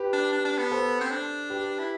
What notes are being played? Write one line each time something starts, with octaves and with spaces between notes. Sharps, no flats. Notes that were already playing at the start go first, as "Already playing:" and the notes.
Already playing: G4 B4
D4
D4
D4
B3
A4 C5
C4
D4
G4 B4
E4